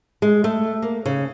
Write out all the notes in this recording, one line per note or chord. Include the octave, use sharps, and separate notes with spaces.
G#3
A3
A#3
C#3